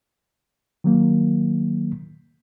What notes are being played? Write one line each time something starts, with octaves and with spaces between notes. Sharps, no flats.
D#3 F#3 A#3